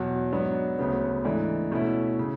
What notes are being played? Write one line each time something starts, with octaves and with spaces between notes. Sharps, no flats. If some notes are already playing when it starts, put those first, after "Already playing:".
Already playing: E2 B2 F#3
G#2 F#3 B3 D4
D2 C#3 F#3 B3
G#2 E3 A3 D4
B2 A3 C#4 E4
C#3